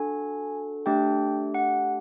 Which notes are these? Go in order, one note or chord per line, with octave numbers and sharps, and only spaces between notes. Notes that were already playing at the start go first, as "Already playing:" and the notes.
Already playing: D4 F#4 A4 G#5
A3 D4 G4 G5
F#5